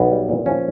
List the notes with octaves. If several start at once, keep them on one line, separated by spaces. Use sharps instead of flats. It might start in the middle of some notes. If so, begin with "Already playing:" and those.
Already playing: B1 B3
G3
A#2
F3 C#4